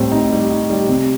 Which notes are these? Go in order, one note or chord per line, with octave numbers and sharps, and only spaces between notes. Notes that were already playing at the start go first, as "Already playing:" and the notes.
Already playing: A2 G3 C4
D#4
G3
D#4
G3
C3